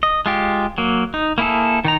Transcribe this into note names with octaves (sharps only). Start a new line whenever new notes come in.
D#5
G#3 F4 G4
F#3 A#3
D#4
A#3 E4 G#4 A4
D#3 D#4 A#5